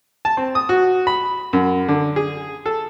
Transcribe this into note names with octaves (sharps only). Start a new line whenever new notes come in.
A5
C4
D#6
F#4
B5
F#2
D3
G#4
A4